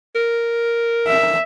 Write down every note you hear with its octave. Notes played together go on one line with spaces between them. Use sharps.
A#4
E5